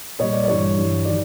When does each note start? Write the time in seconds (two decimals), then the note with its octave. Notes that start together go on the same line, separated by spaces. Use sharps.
0.19 A#2 G3 C#5 D#5
0.33 D5
0.44 D5
0.47 G2 E3 G3 C#5
0.77 G2 E3 G3
1.05 D#3 F#3 D5